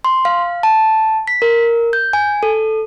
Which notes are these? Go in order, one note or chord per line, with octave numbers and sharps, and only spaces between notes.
C6
F5
A5
B6
A#4
G6
G#5
A4